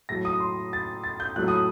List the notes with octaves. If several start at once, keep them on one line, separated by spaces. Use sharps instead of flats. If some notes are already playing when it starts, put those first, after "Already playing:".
A2 F#3 A3 A#6
D#6
C6
A6
A6
G6
A2 F#3 A3 F#6
D#6